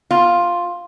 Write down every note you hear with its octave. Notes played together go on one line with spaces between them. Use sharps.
F4